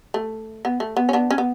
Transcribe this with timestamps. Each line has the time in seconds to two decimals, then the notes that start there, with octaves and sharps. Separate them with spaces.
0.14 A3
0.65 B3
0.80 A3
0.97 B3
1.09 C#4
1.13 B3 D4
1.31 C#4
1.38 B3